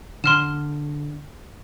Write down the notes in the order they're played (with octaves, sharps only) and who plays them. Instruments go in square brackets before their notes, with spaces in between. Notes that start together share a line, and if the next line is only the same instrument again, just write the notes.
[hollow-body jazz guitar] D3 [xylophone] C6 F6 E7